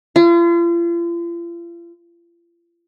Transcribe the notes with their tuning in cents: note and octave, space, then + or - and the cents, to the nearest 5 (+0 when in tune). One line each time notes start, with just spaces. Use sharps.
F4 -40